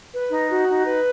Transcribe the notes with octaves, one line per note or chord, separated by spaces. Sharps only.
B4
D#4
F#4
D#4
B4